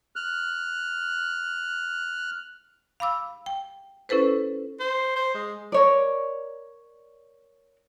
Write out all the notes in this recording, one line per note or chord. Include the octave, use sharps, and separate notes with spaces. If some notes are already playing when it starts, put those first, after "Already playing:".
F6 F#6
F5 B5 D6 E6
G5
C#4 E4 A4 B4 C5
C5
C5
G#3
A#4 C#5 D5